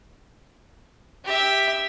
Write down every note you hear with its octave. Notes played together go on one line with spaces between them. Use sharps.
G4 E5